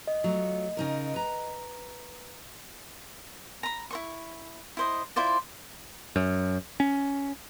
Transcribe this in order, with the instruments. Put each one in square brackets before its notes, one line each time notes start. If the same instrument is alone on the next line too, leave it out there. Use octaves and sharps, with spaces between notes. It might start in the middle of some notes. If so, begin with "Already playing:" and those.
[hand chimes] D#5
[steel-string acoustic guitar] F#3 A3 F4
C#3 D#4 A#4
B4 A#5
[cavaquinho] A#5 B5
E4 C5 C#6
E4 C5 D#5
E4 F4 C5 D5
[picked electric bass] F#2
C#4